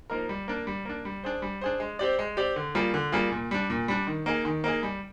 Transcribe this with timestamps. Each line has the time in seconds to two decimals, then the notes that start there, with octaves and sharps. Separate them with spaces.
0.10 F3 A#3 D#4 A#4
0.29 G3
0.48 A#3 D4
0.67 G3
0.85 A#3 D4
1.05 G3
1.24 D4 G#4 C5
1.42 G3
1.61 D4 G#4 C5
1.80 G#3
1.99 C4 G4 D5
2.19 G#3
2.37 C4 G4 D5
2.56 D3
2.75 G3 A#3 F4 G#4
2.94 D3
3.12 G3 A#3 F4 G#4
3.32 A#2
3.51 G3 D4
3.70 A#2
3.88 G3 D4
4.07 D#3
4.26 A#3 D#4 G#4
4.45 D#3
4.64 A#3 D#4 G#4
4.83 G3